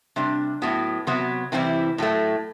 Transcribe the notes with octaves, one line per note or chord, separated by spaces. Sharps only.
C3 G3 D4
A2 F#3 B3 F#4
C3 F#3 B3 F#4
C3 E3 G3 C4 E4
A2 F#3 A3